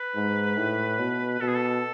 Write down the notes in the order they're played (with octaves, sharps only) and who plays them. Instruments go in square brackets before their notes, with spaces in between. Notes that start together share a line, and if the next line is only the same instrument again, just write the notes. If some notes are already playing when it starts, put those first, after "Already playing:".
Already playing: [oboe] B4
[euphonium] G#2
A2
B2
[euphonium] B2 [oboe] A4
[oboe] G#4
A4